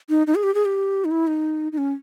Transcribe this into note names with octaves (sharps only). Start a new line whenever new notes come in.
D#4
D#4
G#4
G4
G#4
G4
D#4
E4
D#4
D#4
C#4